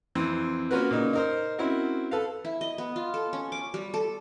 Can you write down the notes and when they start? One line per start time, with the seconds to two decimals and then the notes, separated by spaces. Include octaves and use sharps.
0.15 F2 E3 C4
0.71 A#3 C#4 F4 F#4 A#4 B4
0.91 A#2 C#3 A#3 D#4
1.13 D#4 A#4 C5
1.58 C4 C#4 E4 F#4 A#4
2.11 A4 B4 F5
2.45 E4
2.61 D#5
2.78 B3
2.96 F4
3.14 A4
3.33 C#4
3.52 D6
3.74 G3
3.94 A4